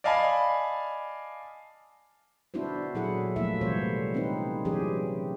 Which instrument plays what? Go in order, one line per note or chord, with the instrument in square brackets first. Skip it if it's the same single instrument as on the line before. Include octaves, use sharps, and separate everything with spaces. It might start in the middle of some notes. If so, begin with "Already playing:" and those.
[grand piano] D5 D#5 F5 G#5 A5 B5
[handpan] B3 D4 E4 F#4 C5
A#2 F#3 E4 G#4 A4 F#5
F3 F#3 A3 A#3 E4 E5
C3 E3 G3 C5 C#5
C4 C#4 D#4 B4
E3 F#3 C#4 G4 G#4